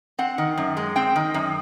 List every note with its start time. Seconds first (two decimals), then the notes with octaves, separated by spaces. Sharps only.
0.19 C4 F#5
0.38 D#3
0.57 F#2
0.77 G#3
0.96 C4 G5
1.16 D#3
1.34 F#2